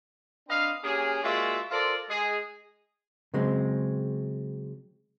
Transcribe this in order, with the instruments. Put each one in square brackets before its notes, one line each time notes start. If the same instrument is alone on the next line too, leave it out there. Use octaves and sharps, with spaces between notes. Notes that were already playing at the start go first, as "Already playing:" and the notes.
[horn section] C4 D4 B4 D#5 F5
A#3 C#4 G4 G#4
G#3 A#3 F4 F#4 D5 E5
F4 A4 A#4 C5 D5
G#3 G#4
[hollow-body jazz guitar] C#3 F#3 G#3 C4